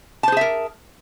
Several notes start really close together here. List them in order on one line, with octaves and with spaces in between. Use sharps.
A5 C5 G#4 E5 A#4